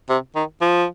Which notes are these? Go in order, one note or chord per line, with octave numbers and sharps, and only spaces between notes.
C3
D#3
F3